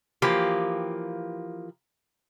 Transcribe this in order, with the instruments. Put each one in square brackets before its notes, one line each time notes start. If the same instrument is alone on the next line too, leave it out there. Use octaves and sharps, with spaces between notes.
[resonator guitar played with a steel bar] E3 F3 A#3 G4